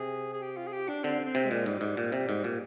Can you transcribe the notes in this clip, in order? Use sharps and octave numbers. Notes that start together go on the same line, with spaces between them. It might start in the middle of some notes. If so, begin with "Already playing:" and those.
Already playing: C3 G#4
G#4
G4
F4
G#4
G4
D4
D3 C4
C4
C3
G#3
A#2
G#2 G3
G#2
A#2
C3
G#2
A#2